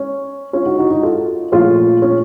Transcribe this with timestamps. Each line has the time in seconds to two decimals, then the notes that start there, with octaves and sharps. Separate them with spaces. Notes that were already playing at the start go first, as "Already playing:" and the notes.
Already playing: C#4
0.53 C#4 F4
0.66 D#4 F#4
0.78 D#4 F#4
0.91 D#4 F#4
1.03 F4 A4
1.52 A#2 F3 A3 C#4 F4
2.02 C#4